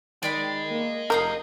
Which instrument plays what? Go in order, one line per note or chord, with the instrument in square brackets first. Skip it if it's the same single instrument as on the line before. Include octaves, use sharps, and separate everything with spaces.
[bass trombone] D#3 [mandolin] D5 G5 B5 [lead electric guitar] D#5 G#5
[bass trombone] A#3
[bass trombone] F1 [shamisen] A#4 [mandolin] F5 D#6 G6